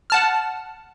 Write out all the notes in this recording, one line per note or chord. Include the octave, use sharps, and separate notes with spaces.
F#5 A5 F6